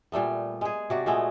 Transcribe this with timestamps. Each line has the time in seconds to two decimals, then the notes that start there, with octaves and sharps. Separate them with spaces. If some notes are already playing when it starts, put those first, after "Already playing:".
0.12 A#2 G3 A3 B3
0.61 G#3 G#4
0.90 C3 F#4 D5
1.06 A#2 G#3 A3 B3